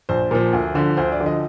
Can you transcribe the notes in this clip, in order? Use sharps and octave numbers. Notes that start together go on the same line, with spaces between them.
A#1 C5
A#2 F3
D2
D3 F3
D2 C5
D5
D3 F3
D#5